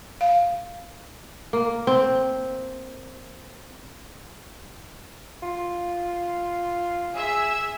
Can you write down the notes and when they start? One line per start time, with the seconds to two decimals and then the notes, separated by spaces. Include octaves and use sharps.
0.21 F5
1.53 A#3
1.87 C4
5.42 F4
7.13 G#4 E5 E6